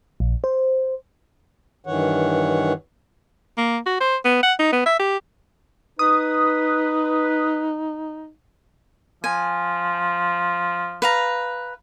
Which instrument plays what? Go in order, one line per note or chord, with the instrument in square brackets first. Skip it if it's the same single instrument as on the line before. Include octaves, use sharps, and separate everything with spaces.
[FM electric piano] A#1
C5
[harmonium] G2 D#3 E3 C#5 F#5
[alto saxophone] A#3
F#4
C5
B3
F#5
D#4
B3
E5
G4
[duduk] D#4 [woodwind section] B4 [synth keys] D#6
[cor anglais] F3 [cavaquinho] G#5
[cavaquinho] B4 F5 A#5